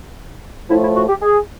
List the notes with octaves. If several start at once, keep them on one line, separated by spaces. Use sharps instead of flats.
A2 F3 A3 E4
E4
F#4
G4
G#4